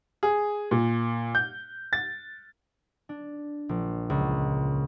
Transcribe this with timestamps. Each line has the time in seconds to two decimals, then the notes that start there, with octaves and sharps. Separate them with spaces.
0.23 G#4
0.71 A#2
1.35 G6
1.93 A6
3.09 D4
3.69 A#1
4.10 C#2